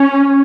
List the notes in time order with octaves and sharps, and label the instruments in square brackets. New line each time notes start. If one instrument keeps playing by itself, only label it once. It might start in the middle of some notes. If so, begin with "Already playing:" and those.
Already playing: [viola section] C#4